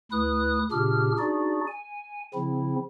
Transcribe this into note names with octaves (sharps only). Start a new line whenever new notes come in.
D2 E4 B4 D#6 F#6
A#2 C#3 D4 G4 G#4 F6
D4 D#4 F#4 G#4 D5
G#5
C#3 F3 C4 E4